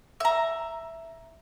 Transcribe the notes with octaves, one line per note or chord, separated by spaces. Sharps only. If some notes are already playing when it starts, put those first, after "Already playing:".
E5 A#5